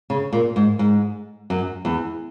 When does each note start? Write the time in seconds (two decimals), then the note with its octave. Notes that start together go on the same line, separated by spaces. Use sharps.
0.10 C#3
0.33 A#2
0.56 G#2
0.79 G#2
1.50 F#2
1.85 E2